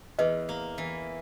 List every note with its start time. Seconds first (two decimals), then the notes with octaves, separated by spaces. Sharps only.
0.19 E2 B4 D#5
0.49 A#3
0.78 E3